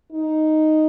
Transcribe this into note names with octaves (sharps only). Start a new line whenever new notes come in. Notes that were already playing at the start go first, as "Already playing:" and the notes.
D#4